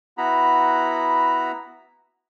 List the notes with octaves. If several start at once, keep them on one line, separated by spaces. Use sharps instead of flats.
B3 E4 F#4 A#5 B5